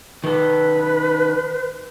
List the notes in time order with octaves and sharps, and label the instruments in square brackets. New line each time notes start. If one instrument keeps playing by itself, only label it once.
[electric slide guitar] D#3 A4 [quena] B4